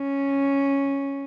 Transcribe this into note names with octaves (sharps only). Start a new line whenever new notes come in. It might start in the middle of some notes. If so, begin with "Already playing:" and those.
Already playing: C#4